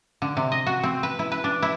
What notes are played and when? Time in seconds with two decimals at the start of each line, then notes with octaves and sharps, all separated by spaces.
0.22 D3
0.37 C3
0.52 D#5
0.66 F#4
0.83 C4
1.03 B4
1.19 E4
1.32 B4
1.44 D4
1.62 E4